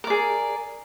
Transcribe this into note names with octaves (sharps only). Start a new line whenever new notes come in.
G#4 A#4 D5